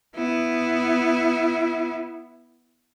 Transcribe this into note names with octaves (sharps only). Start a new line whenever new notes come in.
B3 E4